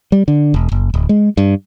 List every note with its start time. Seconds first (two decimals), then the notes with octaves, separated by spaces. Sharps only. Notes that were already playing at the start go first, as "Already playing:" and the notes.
0.12 G3
0.28 D3
0.54 E1
0.72 F#1
0.94 D1
1.09 G#3
1.37 G2